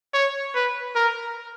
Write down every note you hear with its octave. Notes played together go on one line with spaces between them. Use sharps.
C#5
B4
A#4